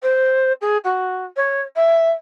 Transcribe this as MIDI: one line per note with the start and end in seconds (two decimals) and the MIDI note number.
0.02 0.52 72
0.61 0.77 68
0.84 1.24 66
1.36 1.61 73
1.76 2.11 76